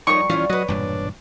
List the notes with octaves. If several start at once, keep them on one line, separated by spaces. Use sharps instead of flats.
F3 G3 D#4 A#4 C#5 C#6
F2 E3 G3 C#4 F4 F5
F#3 C#4 F#4 B4 D#5
E1 G2 A#2 D4